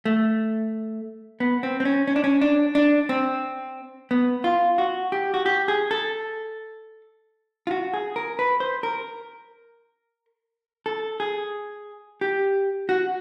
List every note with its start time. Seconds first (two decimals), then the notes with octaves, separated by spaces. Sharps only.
0.05 A3
1.40 B3
1.63 C4
1.80 C4
1.85 C#4
2.07 C#4
2.16 D4
2.24 C#4
2.41 D4
2.75 D4
3.09 C4
4.11 B3
4.44 F4
4.78 F#4
5.12 G4
5.34 F#4
5.46 G4
5.68 G#4
5.91 A4
7.67 F4
7.71 F#4
7.94 G#4
8.16 A#4
8.39 B4
8.60 C5
8.83 A#4
10.86 A4
11.20 G#4
12.21 G4
12.89 F#4